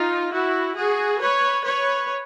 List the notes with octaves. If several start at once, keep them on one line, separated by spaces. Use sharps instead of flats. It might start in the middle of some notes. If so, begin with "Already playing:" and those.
Already playing: D#4 F4
E4 F#4
F#4 G#4
B4 C#5
B4 C#5